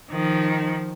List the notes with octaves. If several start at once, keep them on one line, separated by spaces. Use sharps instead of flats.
D#3 F3